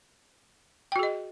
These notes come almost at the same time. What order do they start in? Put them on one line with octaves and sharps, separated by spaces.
G5 F#4 G#4 D#5